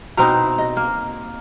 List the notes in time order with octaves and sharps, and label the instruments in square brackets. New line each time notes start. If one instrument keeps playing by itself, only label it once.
[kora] B2 C4 D#4 [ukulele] E4 B4 A#5
[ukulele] D#5
[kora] A#3